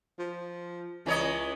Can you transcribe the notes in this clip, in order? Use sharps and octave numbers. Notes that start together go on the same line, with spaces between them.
F3
C#2 E3 C#5 D#5